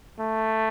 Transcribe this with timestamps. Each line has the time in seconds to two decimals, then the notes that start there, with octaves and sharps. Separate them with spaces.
0.19 A3